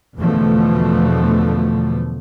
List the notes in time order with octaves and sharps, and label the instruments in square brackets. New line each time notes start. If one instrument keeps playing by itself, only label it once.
[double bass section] E2 B2 D3 F3 A3